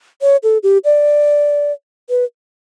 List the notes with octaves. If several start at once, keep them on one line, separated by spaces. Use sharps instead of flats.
C#5
A4
G4
D5
B4